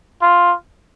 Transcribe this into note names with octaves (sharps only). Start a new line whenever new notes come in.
F4